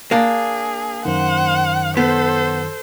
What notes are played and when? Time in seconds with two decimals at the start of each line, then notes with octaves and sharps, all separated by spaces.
0.11 A#3 D4 G#4
1.05 F#2 D#3 C5 F#5
1.97 B3 A4 C5